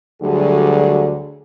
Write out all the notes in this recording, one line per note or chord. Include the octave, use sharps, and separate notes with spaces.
D2 D3 F#3 G3 G#4